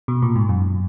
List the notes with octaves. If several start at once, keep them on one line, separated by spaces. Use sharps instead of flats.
B2
A#2
G#2
F#2